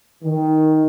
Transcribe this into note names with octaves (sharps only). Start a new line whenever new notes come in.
D#3